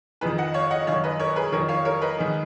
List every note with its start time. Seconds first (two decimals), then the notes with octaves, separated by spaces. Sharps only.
0.21 F2 D#3 G#4 B4
0.38 D#5 F#5
0.54 C#5 F5
0.70 D#5 F#5
0.87 F#2 D#3 C#5 F5
1.04 B4 D#5
1.19 A#4 C#5
1.36 G#4 B4
1.52 F2 D#3 A#4 C#5
1.68 C#5 F5
1.85 A#4 C#5
2.02 B4 D#5
2.18 G#2 D#3